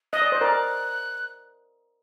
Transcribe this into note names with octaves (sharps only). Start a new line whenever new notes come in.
D#5 F#6
D5
C5
A#4 D5